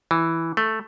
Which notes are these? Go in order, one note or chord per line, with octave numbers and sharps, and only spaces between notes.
E3
A3